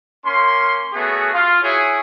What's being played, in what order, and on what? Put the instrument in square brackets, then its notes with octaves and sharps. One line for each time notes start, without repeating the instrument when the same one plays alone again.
[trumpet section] A#3 C#4 C6
A3 B3 C#4 F#4 G#4
F4
E4 F#4 G#4 C#5